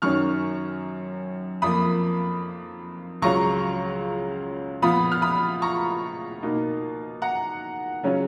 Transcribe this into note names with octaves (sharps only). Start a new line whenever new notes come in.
F#2 D#3 F#3 C#4 C#6 F6
F2 F3 A#3 B5 D#6
C#2 C#3 F#3 C#4 F4 A#5 C#6
A#2 F3 B3 F4 B5 D#6
F6
B5 D#6
A#5 C#6
B2 A#3 D#4
F#5 A#5
C#3 F#3 C#4 F4